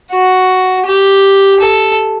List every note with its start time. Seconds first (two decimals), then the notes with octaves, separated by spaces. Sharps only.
0.11 F#4
0.86 G4
1.60 A4